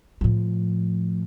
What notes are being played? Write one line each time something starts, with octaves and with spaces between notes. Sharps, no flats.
A2 F3